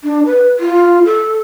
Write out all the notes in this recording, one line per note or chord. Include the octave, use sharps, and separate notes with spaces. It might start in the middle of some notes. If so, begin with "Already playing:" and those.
D4
B4
F4
A4